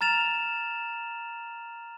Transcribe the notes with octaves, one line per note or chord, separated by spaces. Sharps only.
A#5 F6 A6 E7 F7